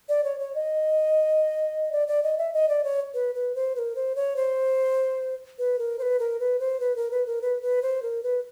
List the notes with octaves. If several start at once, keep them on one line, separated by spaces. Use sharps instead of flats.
D5
C#5
C#5
D#5
D5
D5
D#5
E5
D#5
D5
C#5
B4
B4
C5
B4
A#4
C5
C#5
C5
B4
A#4
C5
B4
A#4
B4
C5
B4
A#4
B4
A#4
B4
B4
C5
A#4
B4